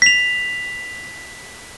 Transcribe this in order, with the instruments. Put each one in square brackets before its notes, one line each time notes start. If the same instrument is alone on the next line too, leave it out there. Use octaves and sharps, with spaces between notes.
[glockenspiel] B6 F7